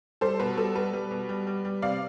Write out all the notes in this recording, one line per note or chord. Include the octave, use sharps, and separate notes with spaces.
G3 A4 C5
B2 B4
G3 A4
G3 B4
G3
B2
G3
G3
G3
C3 D5 F5